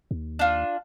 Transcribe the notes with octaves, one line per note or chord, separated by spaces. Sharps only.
D#2
D4 F4